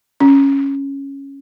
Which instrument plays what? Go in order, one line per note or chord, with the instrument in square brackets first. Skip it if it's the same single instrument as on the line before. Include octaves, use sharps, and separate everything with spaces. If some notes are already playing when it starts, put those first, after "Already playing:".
[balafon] C#4